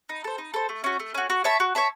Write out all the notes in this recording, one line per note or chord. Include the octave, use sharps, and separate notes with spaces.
D#4
A4 C5
D#4
A4 C5
A3
C#4 F#4
A3
C#4 F#4
F#4
C#5 E5 A5
F#4
C#5 E5 A5